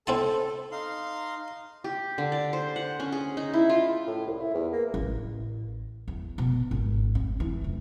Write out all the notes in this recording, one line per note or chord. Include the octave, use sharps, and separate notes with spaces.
C4 E4 A4 A5
D#4 F5 C6
G4
D3
D5
C5
F#5
C#4
G#4
D#4
E4
F4
A2
C2
E4
E2
A#3
A1
E2
B2
G#1
C4
E3
F1